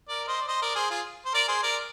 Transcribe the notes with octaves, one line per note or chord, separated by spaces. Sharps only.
A#4 D5
C5 D#5
D5
C5 D#5
A#4 D5
G#4 C5
F4 G#4
C5
A#4 D5
G#4 C5
A#4 D5